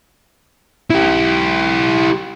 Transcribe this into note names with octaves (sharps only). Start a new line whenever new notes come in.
E4 G4